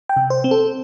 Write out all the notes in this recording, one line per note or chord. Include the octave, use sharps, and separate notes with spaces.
G5
C3
C5
C4
A4